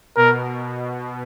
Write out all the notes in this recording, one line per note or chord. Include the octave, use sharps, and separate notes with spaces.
B2 A#4